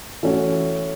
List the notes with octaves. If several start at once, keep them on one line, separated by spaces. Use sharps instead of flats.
E3 A3 C#4 F#4